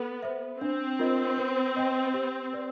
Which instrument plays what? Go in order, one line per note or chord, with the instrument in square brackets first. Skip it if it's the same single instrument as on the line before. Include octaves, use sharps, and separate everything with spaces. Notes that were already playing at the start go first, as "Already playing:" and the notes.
Already playing: [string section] B3 [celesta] A4
[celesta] C5 E5
[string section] C4 [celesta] D4
[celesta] F4 A#4 D#5
B4
D#5 G5
G4
B4 D5